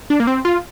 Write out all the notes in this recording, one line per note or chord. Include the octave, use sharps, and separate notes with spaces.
D4
A#3
C4
F4